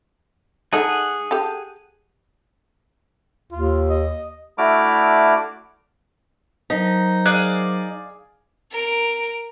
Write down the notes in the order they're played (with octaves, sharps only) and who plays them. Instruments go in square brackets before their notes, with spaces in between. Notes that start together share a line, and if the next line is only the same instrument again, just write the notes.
[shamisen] G#3 D#4 A4 [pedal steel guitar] G#4 F#5
[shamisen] G4 A4
[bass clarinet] D#2 [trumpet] F4
[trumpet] D#5
[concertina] A3 D4 E4 F#4 D6 F6
[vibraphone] F#3 A#4 C5 [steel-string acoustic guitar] D#4
[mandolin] G#4 D5 F5 [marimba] F#6
[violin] A#4 D7